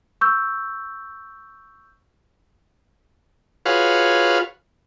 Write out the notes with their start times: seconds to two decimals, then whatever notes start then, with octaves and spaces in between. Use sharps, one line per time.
0.21 C#6 E6 G6
3.66 F4 F#4 G#4 B4 C#5 F5